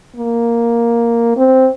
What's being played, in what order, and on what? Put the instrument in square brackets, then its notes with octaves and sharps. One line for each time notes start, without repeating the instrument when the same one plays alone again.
[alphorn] A#3
C4